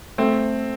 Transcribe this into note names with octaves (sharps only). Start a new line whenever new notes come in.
A3 C4